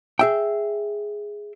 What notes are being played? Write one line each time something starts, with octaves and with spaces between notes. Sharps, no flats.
G#4 E5 G5